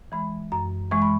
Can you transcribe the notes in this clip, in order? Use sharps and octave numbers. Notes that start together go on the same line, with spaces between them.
E3 G#3 B5
F#2 A#5
E3 G#3 C#6
B5